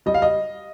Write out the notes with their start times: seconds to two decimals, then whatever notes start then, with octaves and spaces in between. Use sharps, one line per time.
0.06 G3 D#5
0.14 F5
0.22 D#5